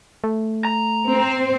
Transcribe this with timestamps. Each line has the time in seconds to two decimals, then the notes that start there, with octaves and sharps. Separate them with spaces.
0.24 A3
0.65 A#5
1.08 C4 C5